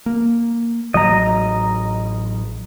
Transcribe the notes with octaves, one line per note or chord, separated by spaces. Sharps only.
A#3
A1 F#3 D#5 A#5